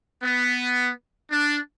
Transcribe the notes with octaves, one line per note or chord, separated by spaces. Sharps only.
B3
D4